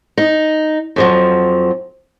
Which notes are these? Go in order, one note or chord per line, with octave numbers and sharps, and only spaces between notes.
D#4
F2 F3 F#3